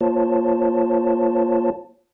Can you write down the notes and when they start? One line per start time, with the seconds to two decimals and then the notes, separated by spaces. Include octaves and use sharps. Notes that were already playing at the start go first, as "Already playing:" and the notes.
0.01 A#3 F4 C5 C#5 A5